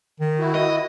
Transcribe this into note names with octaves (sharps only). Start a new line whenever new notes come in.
D#3
E4 F#4
D#5